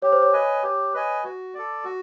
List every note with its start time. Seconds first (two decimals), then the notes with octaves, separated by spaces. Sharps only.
0.02 G4 C#5
0.12 C5
0.23 C#5
0.33 B4 D#5 G#5
0.63 G4
0.94 B4 D#5 G#5
1.24 F#4
1.54 A4 D5
1.85 F#4